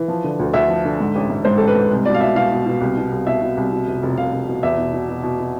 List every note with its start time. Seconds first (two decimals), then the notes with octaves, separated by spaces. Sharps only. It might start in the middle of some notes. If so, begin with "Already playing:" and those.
Already playing: E3
0.08 F3
0.24 D3
0.39 D2
0.54 D2 E5
0.69 F3
0.85 D3
1.00 G#2
1.15 A1
1.30 G#2
1.45 G#2 C5
1.57 A1 A4
1.67 B4
1.75 G#2
1.91 C2
2.05 B2 D5
2.14 F5
2.21 B2 E5
2.36 B2 F5
2.51 B2
2.66 B2
2.81 C2
2.97 B2
3.12 C2
3.26 B2 E5
3.41 B2
3.57 C2
3.72 B2
3.87 F1
4.03 F1
4.17 F1 F5
4.33 F1
4.48 B2
4.63 E2 E5
4.78 B2
4.93 B2
5.08 B2
5.23 B2
5.39 B2